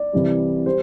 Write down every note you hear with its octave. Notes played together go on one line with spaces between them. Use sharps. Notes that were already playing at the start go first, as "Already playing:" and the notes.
Already playing: D5
C2 C3 E3 G3
G3 C5